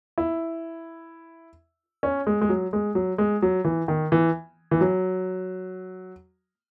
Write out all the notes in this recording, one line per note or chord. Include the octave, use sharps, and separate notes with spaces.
E4
C#4
G#3
G#3
F#3
G#3
F#3
G#3
F#3
E3
D#3
E3
E3
F#3